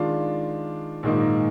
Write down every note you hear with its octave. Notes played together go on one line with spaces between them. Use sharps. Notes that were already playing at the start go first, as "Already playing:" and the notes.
Already playing: D#3 G#3 D4 F4
A#1 G#2 D#3 A#3 D#4